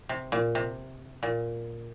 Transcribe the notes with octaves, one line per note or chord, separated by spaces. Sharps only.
C3
A#2
C3
A#2